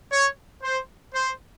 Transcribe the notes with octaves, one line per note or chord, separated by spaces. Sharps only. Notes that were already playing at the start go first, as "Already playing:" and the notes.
C#5
C5
C5